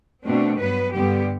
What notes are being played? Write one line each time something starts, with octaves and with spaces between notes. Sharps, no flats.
B2 A3 C4 D4
G2 F#3 B3 B4
G2 D3 G3 B3 G4